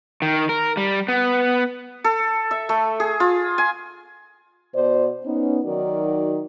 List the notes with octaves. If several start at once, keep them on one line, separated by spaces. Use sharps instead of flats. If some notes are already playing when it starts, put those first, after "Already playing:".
D#3
A#4
G3
B3
A4
E5
A3
G#4
F4
G#5
B2 C5 D5
B3 C#4 D#4
D#3 F#3 D#4 F#4 A#4 D5